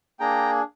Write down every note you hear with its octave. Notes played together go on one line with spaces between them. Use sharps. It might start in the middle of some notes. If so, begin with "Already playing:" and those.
A#3 D4 G#4 G5 A#5